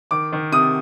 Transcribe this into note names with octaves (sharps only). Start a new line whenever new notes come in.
D#3 D6
D#3
C3 D#6